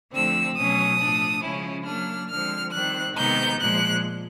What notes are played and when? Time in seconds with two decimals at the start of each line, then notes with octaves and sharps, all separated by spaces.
0.12 D3 F3 A3 C4 E6
0.55 B2 F#3 A3 C#4 D#6
0.99 A2 F3 A3 D4
1.42 C#3 F3 G#3 C#4 E4
1.84 F#3 A#3 D4 F6
2.28 D3 F3 G#3 C4 F6
2.71 D#3 G3 C4 F#6
3.14 C3 D#3 G#3 B3 D#4 G6
3.58 A#2 F3 G#3 F#6